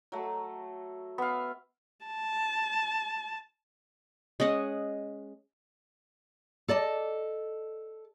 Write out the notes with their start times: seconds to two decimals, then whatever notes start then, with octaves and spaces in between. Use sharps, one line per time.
0.12 F#3 A3
1.18 B3 E5 F5
2.06 A5
4.40 G#3 C#4 D#5 F#5
6.68 A4 D5 D#5 A5